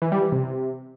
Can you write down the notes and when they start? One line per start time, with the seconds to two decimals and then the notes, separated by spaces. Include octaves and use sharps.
0.02 E3
0.12 G3
0.22 E3
0.32 C3